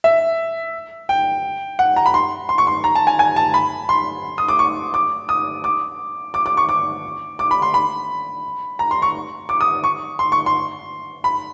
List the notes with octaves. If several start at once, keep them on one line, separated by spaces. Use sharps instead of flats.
E5
G5
F#5
A#5
B5
C6
C6
C#6
C6
A#5
A5
G#5
G#5
A5
B5
C6
D#6
D6
C#6
D6
D#6
D6
D6
D6
C#6
D6
D6
B5
C6
B5
A#5
C6
C#6
D6
D#6
C#6
C6
C#6
C6
B5